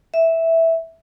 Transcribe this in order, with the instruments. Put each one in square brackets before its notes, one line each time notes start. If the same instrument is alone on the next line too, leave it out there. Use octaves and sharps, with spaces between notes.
[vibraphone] E5